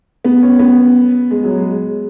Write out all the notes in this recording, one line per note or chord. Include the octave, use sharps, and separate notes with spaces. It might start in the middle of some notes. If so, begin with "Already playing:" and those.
B3
C#4
B3
G#3
F#3
G#3